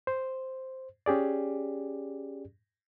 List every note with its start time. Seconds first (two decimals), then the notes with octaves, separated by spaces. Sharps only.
0.07 C5
1.06 C#4 G4 G#4 D5